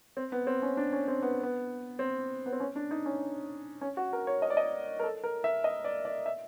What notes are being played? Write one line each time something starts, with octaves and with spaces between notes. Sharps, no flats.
C4
B3
C4
C#4
D4
C#4
C4
B3
B3
C4
B3
C4
C#4
D4
D#4
C#4
C#4
F#4
A#4
C#5
D#5
D5
D#5
A#4
A4
A#4
E5
D#5
D5
D5
E5